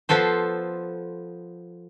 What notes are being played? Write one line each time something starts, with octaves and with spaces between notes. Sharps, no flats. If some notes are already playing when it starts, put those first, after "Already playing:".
F3 B3 A4 C5